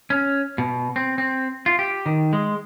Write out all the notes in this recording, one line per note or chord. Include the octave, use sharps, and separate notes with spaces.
C#4
B2
C4
C4
F4
G4
D#3
G#3